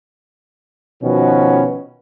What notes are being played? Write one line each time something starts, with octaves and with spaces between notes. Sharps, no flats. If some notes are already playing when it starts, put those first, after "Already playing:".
B2 D#3 F3 C#4 F#4 B4